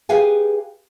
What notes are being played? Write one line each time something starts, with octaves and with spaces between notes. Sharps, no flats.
G4 G#4 B4 F5 G5 G#5